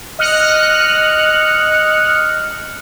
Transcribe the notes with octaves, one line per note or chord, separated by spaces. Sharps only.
D#5 F6 F#6 C#7